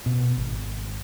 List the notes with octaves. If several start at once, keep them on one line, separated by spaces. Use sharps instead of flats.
B2
G#1